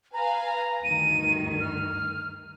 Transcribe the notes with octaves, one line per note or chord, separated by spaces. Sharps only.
B4 F5 G#5 A#5
A#5
D2 G2 D#3 D#7
F6